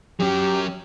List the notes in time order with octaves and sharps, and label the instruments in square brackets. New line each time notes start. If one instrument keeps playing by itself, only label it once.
[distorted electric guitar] F#3 C#4 [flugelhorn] G4